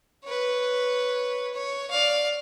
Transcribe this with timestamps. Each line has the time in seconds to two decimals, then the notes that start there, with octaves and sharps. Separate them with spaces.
0.24 B4 C#5
1.53 C#5
1.90 D5 F5